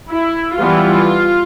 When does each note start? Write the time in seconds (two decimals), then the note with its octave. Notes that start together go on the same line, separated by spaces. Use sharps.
0.10 E4
0.58 E3 G3 B3 F4